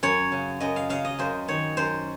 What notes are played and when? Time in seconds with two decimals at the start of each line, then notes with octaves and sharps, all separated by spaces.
0.03 F#2 C#5
0.32 C#3
0.60 F#2 D#5
0.76 F5
0.90 C#3 F5
1.05 D#5
1.19 F#2 C5
1.48 D#3 C#5
1.77 F#2 C5